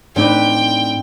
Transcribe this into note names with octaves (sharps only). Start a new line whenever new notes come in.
A2 C4 D4 D#4 B4 D5 G5